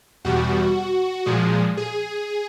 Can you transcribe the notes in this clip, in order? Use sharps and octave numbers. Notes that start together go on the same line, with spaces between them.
E2 B2 G3 F#4
A#2 F3 G#3
G#4